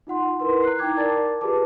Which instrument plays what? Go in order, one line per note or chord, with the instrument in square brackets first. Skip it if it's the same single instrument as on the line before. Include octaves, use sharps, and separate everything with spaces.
[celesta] D#4 F4 F#5 C6
E4 A#4 B4 C6
A#5 F#6 C7
D#4 E4 G5 A#5 D6 G#6
A#4 D5 A5 D6 A6
F4 G4 G#4 B4 A5 D6